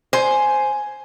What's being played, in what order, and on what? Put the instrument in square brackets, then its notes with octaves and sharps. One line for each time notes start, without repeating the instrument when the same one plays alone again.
[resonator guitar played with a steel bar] C5 [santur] G#5